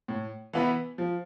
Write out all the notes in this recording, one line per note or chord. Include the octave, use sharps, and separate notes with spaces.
A2
E3 B3 E4 B4
F3